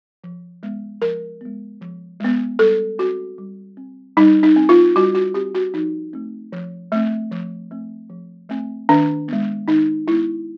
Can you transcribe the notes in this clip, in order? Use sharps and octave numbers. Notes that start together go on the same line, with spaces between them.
F3
G#3 B3
F3 A#4
G#3 B3
F3
G#3 B3
G3 A4
C4 F#4
G3
C4
G3 D#4
D#4
C4
F4
G3 F#4
F#4
C4 G4
F#4
F3 D#4
A3 C4
F3
A3 C4
F3
A3 C4
F3
A3 C4
D#3 D4
G#3 B3
D#3 D#4
G#3 B3 E4